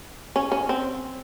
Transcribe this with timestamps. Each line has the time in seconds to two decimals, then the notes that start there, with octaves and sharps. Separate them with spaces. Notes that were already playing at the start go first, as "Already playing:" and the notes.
0.36 C#4
0.52 C#4
0.69 C4